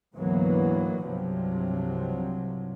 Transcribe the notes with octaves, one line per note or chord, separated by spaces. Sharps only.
D2 G#2 E3 F#3 A#3 B3
C2 G2 C3 F3 F#3